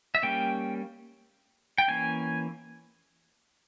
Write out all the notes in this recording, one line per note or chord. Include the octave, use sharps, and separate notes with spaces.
E5
G3 A#3 C#4 G5
G5
E3 A#3 C#4 G#5